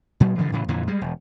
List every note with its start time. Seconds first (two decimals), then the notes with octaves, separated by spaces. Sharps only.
0.20 A#2 F#3
0.38 G2 C#3 E3 F3
0.52 A2 C#3 E3
0.68 F2 A#2 D3 E3
0.88 G3 G#3
1.01 E1